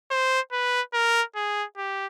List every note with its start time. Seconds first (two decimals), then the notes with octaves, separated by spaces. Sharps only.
0.11 C5
0.52 B4
0.94 A#4
1.35 G#4
1.77 G4